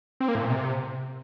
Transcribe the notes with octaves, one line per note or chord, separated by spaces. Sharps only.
C4
A#3
A2
A#2
C3